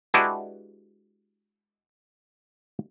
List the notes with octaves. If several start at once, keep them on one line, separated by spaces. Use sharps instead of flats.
G#3 D4 E4 F#4 G4 B4